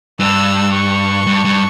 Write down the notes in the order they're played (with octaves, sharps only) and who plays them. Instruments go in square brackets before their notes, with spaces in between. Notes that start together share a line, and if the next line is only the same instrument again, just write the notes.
[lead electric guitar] G2 [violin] E6
[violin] C#6
[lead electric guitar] G2
G2